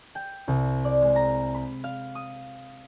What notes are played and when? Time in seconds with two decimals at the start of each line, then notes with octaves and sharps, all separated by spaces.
0.15 G5
0.48 C2
0.85 D5
1.02 G#3
1.16 A#5
1.54 B5
1.84 F5
2.15 D#6